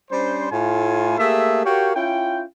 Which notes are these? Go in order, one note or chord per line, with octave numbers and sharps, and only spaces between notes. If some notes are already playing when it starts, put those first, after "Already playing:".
G3 C#4 D4 C5
A2 F4 G#5
A3 A#3 G4 G#4 E5
F#4 G4 A#4 C#5 F5 G5
C#4 E4 F4 G5